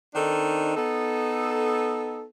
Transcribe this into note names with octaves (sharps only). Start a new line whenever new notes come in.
D#3 C4 D4 D#4 A4
B3 D#4 A4